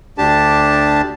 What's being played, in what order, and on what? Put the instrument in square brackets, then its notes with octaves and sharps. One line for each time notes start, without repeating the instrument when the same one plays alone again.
[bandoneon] D2 D4 G4 A5